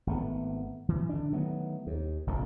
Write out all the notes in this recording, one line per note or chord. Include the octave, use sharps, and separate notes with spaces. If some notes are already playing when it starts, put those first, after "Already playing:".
G#1 A3 B3
E3
D3 D4
D#3 F#3 A3 B3
D#2
F1 A#1 F2 A#2